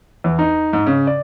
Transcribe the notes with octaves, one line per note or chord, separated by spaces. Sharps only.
E2
D#4
G#2
C#3
D5